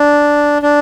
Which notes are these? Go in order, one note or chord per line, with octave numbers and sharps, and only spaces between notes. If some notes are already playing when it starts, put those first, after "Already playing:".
Already playing: D4
D4